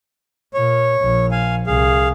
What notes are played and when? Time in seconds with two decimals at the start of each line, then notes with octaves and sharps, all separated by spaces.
0.54 A#2 C#5
1.00 A#1
1.31 F5 G#5
1.66 C2 G#4 F5